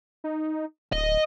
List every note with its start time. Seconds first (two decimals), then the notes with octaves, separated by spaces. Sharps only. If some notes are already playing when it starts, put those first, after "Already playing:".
0.24 D#4
0.93 D1 D#5